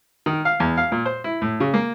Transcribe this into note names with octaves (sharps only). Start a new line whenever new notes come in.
D#3
F5
E2
F5
A#2
C5
E4
A2
C#3
A#3